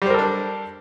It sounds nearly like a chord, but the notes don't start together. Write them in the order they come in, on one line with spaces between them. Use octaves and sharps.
G3 C5 A#4 A4 D4